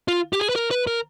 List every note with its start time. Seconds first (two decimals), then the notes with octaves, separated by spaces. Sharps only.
0.08 F4
0.33 G4
0.40 G#4
0.50 B4
0.56 A#4
0.71 B4
0.87 A#4